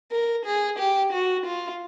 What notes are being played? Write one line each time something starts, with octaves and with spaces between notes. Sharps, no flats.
A#4
G#4
G4
F#4
F4